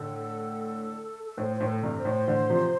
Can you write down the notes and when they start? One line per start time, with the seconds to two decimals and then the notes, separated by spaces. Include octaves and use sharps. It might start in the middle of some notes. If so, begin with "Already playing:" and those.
Already playing: A2 D3 A4
1.26 A4
1.38 A2 C5
1.56 A2 C5
1.68 A4
1.83 G2 C3
1.98 C5
2.05 A2
2.28 A2 D3
2.50 C3 F3